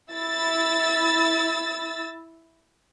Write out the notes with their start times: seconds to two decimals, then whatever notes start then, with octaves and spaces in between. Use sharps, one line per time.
0.11 E4 E6 A6